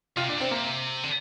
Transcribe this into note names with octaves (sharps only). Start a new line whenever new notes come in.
C3 F4
A#2 D4
C3 C4
A#3
D3